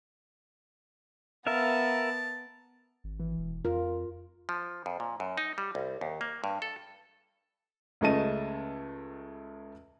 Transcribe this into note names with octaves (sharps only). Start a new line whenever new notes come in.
B3 A#4 E5 F5 A5
G#1
E3
E1
F2 F4 A#4
F3
F2
A#2
F#2
D#4
G3
C2
D#2
A#3
G2
A4
C#2 C#3 A3 D#5 A5 D#7